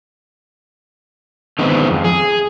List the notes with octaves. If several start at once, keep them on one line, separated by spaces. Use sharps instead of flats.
D3 D#3 G#3 B3 C4
F2
G#4